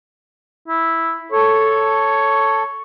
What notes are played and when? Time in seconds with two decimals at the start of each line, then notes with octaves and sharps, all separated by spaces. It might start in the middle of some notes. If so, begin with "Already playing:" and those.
0.68 E4
1.32 A4 C#5